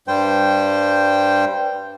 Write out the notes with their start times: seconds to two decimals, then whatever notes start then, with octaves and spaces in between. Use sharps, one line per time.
0.08 G2 G3 C5 G5